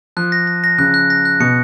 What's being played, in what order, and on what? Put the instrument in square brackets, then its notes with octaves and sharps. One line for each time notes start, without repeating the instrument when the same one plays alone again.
[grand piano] F3 [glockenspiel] F#6
[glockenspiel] A#6
A#6
A#6
[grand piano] C#3 [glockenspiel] F#6
[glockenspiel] F#6
A#6
F#6
[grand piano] B2 [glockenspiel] C#7